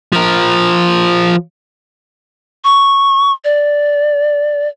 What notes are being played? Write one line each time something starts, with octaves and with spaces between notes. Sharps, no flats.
F3 A#4
C#6
D5